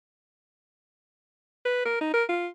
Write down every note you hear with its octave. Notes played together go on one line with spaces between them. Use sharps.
B4
A#4
D#4
A#4
F4